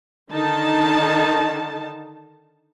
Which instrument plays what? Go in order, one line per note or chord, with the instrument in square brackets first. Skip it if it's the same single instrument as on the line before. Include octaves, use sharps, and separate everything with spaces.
[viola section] D3 D#3 D#4 A5